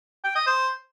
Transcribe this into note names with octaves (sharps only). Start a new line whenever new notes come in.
G5
D#5
C5